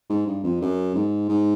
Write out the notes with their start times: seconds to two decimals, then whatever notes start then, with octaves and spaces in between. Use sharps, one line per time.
0.09 G#2
0.27 G2
0.44 F2
0.61 F#2
0.95 G#2
1.29 G#2